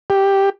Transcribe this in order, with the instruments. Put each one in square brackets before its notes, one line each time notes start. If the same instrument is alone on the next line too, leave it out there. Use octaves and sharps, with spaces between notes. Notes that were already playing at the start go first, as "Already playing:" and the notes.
[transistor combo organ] G4